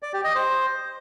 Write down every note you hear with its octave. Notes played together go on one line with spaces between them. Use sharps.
D5
G4
D#5
C5